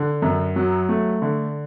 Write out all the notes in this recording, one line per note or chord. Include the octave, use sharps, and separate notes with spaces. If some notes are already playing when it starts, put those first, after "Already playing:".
Already playing: D3
F#2
F#3
A3
D3